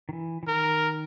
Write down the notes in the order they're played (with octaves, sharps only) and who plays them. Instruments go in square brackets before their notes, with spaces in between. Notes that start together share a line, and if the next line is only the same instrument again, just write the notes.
[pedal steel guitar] D#3
E3
E3
[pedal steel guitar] D#3 [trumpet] A#4